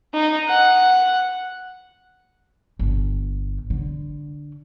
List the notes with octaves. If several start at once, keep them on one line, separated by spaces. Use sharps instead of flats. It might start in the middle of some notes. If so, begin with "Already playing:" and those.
D#4
F#5
G1
D3